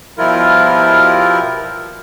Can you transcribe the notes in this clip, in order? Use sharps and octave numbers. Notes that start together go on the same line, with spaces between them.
B2 F3 G3 E4 F4 A#4